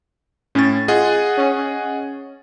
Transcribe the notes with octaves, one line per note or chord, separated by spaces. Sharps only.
A2 C#4 A6
F4 G#4 D#5 F#5
C#4